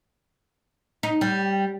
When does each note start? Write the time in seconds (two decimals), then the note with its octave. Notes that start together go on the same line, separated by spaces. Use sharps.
1.03 D#4
1.21 G3